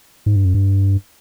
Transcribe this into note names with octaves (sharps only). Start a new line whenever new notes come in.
G#2
G2
F#2
G2